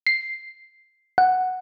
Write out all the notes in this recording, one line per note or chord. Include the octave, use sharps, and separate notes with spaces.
C7
F#5